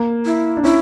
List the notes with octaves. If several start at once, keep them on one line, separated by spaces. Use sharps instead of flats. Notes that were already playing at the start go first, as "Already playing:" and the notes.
Already playing: A#3
E4
D4
C#4 E4